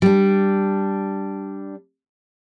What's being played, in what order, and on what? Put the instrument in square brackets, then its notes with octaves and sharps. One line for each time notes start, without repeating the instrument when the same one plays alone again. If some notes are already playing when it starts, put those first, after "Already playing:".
[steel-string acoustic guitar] G3 D4